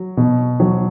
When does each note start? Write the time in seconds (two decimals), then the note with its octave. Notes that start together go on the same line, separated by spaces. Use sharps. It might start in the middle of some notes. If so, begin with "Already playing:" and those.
Already playing: F#3
0.17 B2
0.60 F#3